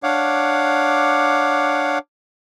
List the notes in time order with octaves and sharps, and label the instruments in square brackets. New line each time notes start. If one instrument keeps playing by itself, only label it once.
[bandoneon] D4 C#5 F5 F#5 D6